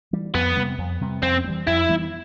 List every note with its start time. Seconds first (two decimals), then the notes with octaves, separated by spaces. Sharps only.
0.13 E3 G3
0.34 F2 B3
0.56 C3 G3 C4
0.78 F2
1.01 C3 G3 C4
1.22 F2 C4
1.44 B3
1.48 E3 G3
1.67 F2 E4
1.89 E3 G3 B3